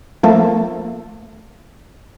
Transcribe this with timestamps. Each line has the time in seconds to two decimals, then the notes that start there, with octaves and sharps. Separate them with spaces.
0.23 F3 A3 A#3 F4 E5 A5